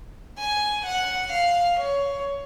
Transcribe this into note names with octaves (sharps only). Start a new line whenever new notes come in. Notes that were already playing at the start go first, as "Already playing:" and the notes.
G#5
F#5
F5
C#5